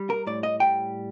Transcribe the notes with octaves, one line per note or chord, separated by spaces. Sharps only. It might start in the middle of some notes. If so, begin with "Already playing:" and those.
Already playing: G3
A#4
A2 D5
D#5
G3 G5